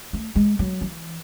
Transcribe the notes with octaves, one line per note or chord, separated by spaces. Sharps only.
A3
G#3
F#3
E3